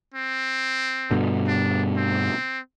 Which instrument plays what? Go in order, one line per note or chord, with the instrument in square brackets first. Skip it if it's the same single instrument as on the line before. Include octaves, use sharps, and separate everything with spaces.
[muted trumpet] C4
[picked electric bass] G2 B2 D3
[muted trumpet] D4
C4